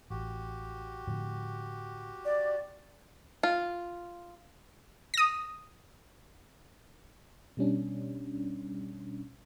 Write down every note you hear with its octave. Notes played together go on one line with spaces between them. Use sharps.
A1 F#4 G4
A2 D3 F3
D5
F4
D#6 A#6
B2 G3 C#4 D4